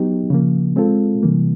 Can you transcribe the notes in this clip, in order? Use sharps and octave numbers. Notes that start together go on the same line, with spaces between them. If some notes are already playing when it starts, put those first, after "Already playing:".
Already playing: F#3 B3 D#4 G4
C#3 F3 A#3
G#3 C4 F4 A4
C3 E3 G3 A#3